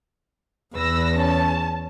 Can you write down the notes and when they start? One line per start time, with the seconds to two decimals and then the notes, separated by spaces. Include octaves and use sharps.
0.76 E2 B4 E6 A#6
1.15 C#4 A5